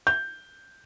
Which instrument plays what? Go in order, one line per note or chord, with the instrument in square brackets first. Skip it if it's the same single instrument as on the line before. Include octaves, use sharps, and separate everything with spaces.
[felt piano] G6